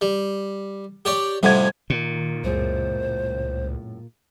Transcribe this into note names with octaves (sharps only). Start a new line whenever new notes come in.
G3
G4 C#5 D5
F2 A2 C3 G3 F#5 G#6
A#2 D#3
C#2 F#2 A2 G#3 C5